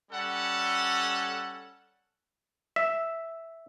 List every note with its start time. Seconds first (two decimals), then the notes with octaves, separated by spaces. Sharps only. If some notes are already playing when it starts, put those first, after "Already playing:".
0.11 G3 C#4 A4 F#5
2.76 E5